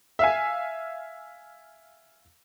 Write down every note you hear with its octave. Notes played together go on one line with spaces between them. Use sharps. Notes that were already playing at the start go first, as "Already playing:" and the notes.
E5 F5 G#5